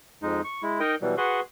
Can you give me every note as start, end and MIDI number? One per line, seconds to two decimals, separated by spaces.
0.22 0.41 41
0.22 0.41 56
0.22 0.41 63
0.44 0.62 85
0.62 0.80 56
0.62 0.80 64
0.80 0.95 63
0.80 0.95 70
0.80 0.95 75
0.80 0.95 79
1.02 1.15 47
1.02 1.15 52
1.02 1.15 54
1.02 1.15 55
1.17 1.40 66
1.17 1.40 68
1.17 1.40 71
1.17 1.40 78
1.17 1.40 84
1.17 1.40 85